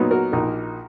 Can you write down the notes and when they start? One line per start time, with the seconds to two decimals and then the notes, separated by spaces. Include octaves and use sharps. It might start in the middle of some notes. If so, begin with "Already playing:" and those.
Already playing: A#2 F#3 B3 D#4
0.11 F#4 A#4
0.32 A#1 A#2 A#3 D#4